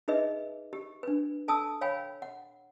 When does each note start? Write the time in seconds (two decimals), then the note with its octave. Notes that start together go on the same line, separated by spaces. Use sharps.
0.08 D#4 G#4 B4 D#5 E5
0.73 G4
1.03 D4 B4
1.48 A4 G#5 A5 D#6 E6
1.81 C#5 F5 G5 G#5 B5
2.22 F#5